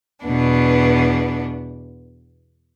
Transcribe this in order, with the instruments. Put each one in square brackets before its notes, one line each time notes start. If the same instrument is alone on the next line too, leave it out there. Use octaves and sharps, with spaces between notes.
[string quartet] E2 B2 B3 D4